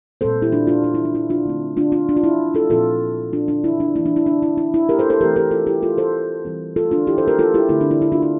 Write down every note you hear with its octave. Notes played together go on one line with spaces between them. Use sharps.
A#2 G3 C4 A4 C5
E4 G4
D4 F4
D4 F4
D4
E4
D4
E4
D4 F4
D3 A3 C4
D4 F4
D4 F4
D4
F4
E4
F4 A4
A#2 F3 C4 F4 A4
D4 F4
D4
E4
D4
E3 A#3 E4
D4
E4
D4
E4
E4
E4
G4 A#4
A4 C5
A4 C5
E3 A3 C4 G4 A#4
G4 A#4
F4 A4
E4 G4
F4 A4
A4 C5
E3 G3 C4
F4 A4
D4 F4
E4 G4
A4 C5
G4 A#4
F4 A4
E4 G4
D3 A3 C4 E4
D4
E4
E4
D4 F4
E4